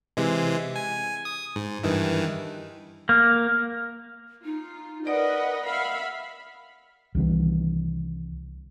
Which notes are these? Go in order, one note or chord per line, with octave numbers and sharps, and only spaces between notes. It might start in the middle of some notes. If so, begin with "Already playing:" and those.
C3 E3 G#3
G#5
D#6
G#2
G2 D#3 E3
A#3
D#4 F4
A#4 B4 D5 D#5 F#5
E5 F5 B5
C2 D#3 E3